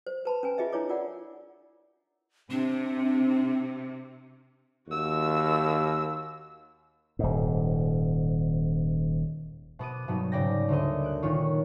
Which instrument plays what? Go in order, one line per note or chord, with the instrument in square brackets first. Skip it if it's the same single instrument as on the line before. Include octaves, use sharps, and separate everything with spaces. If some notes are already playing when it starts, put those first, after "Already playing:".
[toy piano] C5
B4 A5 B5
C#4 B4 G#5
F4 G#4 D#5 E5
D4 E4 F4 C#5 D6
F4 A#4 D5 F#5
[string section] C3 [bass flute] C4 [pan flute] D4
[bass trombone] D#2 [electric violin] F#4 E6
[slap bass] D#1 G#2
[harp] B2 B3 D6 D#7
G2 B2 F#3 B3 D#4
G#2 C#3 D5 G5 A#6
D2 D3 A#3 D#5
F#6 D7
A#2 D#3 F4 C#5